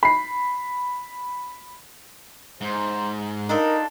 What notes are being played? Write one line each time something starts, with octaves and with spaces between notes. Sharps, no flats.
B5 C7
G#2 C5
D4 D#4 F4 A4 A#4